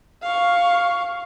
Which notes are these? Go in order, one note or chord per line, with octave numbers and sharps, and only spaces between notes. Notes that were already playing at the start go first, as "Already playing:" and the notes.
F5 C#6